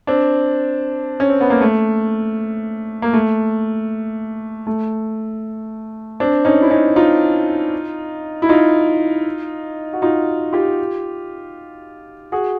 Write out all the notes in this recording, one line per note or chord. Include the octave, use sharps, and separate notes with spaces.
C4 D4
C#4
C4
B3
A#3
A3
A#3
A3
A3
C4 D4
C#4 D#4
E4
C#4 D#4
D#4 F4
E4
D#4 F4
F#4
D#4 F4
F4 G4
F#4 G#4